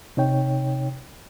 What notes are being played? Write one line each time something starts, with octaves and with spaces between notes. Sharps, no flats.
C3 D#4 C#5 G5